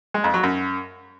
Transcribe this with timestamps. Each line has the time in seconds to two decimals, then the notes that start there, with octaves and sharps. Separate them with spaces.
0.14 G#3
0.24 F2
0.34 F#3
0.43 F#2